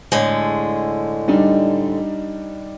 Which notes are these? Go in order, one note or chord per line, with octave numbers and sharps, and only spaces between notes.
A2 D3 G#3
G3 D4 D#4